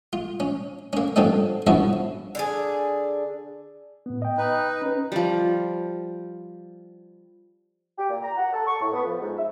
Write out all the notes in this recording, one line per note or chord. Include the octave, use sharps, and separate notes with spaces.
F4
C#4
A#3 C#4
G2 D3 F3 C4 C#4 D#4
G2 F3 B3 C#4 E4 F#4
D3 D4 G#4
A2 B3
D#5 G5
D#4 B4
C#4 B4
F3 G3
G4
A#2
A#5
F#5
A4
C#6
A2
B3
F3
G#2
E5